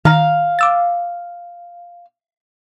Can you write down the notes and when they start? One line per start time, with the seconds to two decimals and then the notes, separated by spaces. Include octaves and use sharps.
0.05 D#3 F5 A#5
0.59 D6 E6 A6